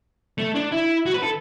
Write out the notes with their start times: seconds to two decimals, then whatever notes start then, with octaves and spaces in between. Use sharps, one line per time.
0.38 A3
0.55 D4
0.72 E4
1.06 F#4
1.14 B4
1.23 A4